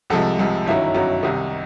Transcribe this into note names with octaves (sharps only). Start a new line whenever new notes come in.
C2 C3 F3 G#3 A4
C2 C3 F3 G#3
G1 F#2 D#3 F#3 E4
G1 F#2 D#3 F#3
C2 C3 D#3 D#4